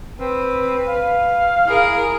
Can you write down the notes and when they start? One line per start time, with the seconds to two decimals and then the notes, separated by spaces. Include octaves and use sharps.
0.20 C4 B4
0.88 F5
1.67 E4 G#4 A#4